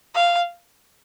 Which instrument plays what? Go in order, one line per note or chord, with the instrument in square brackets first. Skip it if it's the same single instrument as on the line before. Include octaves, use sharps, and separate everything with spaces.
[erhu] F5